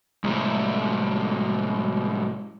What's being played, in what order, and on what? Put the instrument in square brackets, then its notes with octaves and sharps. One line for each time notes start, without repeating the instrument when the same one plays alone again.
[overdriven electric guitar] C2 A2 [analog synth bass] G#3